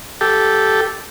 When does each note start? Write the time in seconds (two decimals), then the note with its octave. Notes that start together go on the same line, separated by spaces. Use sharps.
0.21 G4 A4